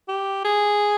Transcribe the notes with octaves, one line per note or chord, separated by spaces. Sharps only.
G4
G#4